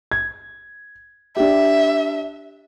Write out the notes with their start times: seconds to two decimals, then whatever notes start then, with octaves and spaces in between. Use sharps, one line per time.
0.12 G#6
1.37 D4 G4 E5